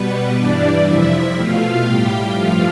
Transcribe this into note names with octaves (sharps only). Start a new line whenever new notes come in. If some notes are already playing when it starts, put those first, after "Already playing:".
Already playing: B2 G3 B3 B4
G2 E3 G3 D4 D5
F2 C3 F3 E4 E5
B2 A3 F4 F5
A2 G3 G4 G5
G2 F3 A3 F4 F5